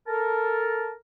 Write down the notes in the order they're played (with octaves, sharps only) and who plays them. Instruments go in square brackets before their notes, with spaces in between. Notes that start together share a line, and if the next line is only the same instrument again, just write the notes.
[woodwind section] A4 A#4 A5